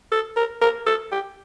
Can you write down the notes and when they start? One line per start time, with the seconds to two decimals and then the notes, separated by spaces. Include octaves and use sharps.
0.12 A4
0.36 A#4
0.62 A#4
0.87 A4
1.12 G4